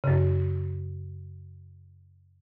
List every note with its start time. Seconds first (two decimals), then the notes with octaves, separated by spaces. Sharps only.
0.04 F#2 C#3